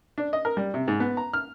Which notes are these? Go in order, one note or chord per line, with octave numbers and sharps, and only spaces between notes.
D4
D#5
A#4
G3
C3
G#2
B3
A#5
F6